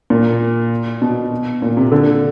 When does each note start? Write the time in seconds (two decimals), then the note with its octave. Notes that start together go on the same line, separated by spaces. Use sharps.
0.10 A#2
1.02 B2
1.62 A#2
1.77 C3
1.92 D3